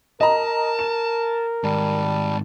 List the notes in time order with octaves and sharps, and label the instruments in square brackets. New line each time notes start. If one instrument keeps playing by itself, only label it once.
[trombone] A#4 [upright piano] D#5 A#5 [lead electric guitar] A5
[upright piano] E7
[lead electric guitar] G#2 D#3 [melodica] G3 A5